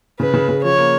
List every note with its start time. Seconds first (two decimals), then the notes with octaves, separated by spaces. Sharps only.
0.19 C#3 B4
0.33 C#3
0.49 C#3
0.64 F3 C#5
0.78 A#3